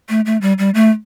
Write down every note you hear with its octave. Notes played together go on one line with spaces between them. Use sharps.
A3
A3
G3
G3
A3